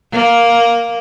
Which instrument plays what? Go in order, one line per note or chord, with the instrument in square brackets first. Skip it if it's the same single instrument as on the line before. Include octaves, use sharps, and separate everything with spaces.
[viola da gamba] A#3